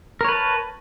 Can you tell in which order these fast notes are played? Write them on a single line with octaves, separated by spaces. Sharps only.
A#4 C#5 B4 A5